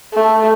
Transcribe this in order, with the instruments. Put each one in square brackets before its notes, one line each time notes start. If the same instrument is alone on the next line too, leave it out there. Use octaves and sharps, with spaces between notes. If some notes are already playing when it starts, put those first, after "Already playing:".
[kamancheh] A3